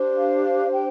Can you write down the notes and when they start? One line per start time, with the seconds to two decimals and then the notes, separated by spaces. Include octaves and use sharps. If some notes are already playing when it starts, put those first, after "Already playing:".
Already playing: D4 G4 C5
0.17 F5
0.73 G5